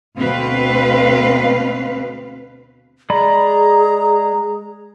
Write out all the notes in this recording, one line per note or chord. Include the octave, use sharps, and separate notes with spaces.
D2 B2 C4 B4 F5
G#3 G#4 D5 A#5 B5